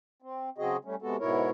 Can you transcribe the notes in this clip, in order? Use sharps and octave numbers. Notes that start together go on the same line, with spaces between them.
C4
C#3 F#3 C4 F#4 G#4 D#5
G3 A3 C#4
C3 G#3 B3 F#4 A4
G#2 B2 E4 A#4 C#5